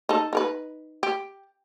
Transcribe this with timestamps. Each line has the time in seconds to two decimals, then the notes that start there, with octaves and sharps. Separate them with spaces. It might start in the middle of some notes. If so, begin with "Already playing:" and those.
0.09 D#4 A4
0.33 D#4 A#4 B4
1.03 G4